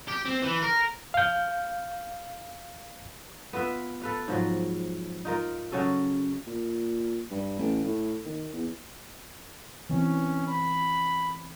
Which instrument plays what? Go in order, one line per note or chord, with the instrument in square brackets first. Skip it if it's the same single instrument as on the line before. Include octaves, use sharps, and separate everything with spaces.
[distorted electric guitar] G4
C4
E3
A#4
[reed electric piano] F5 G6
[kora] B3 F4 B4 E5
A4 B4 F5
G#2 F3 F#3
D#4 F4 A#4
C#3 F#3 C#4 A4
[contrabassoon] A#2
G2
A1
A2
D#3
E2
[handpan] E3 C4 [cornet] C#4
[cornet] B5